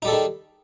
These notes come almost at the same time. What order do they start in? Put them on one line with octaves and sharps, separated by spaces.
D#4 G3 A4 G#4 D#3